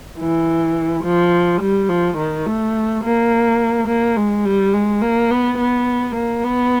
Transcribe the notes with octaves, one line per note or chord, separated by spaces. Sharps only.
E3
F3
G3
F3
D#3
A3
A#3
A#3
G#3
G3
G#3
A#3
B3
B3
A#3
B3